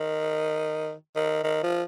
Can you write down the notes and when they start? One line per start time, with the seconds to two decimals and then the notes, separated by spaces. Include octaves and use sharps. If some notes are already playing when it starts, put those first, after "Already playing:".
Already playing: D#3
1.16 D#3
1.44 D#3
1.63 F3